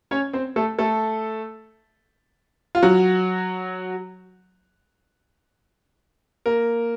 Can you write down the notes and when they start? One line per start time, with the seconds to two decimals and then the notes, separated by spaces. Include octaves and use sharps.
0.11 C#4 C#5
0.33 C4 C5
0.56 A3 A4
0.79 A3 A4
2.75 F4
2.83 F#3 F#4
6.46 A#3 A#4